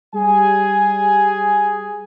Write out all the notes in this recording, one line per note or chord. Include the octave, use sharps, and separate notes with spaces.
G3 G#4 G#5